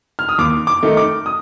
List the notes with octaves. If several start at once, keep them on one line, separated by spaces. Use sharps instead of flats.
F6
D#6
D#2 D6
D6
D#3 A3 D#4
D6
D#6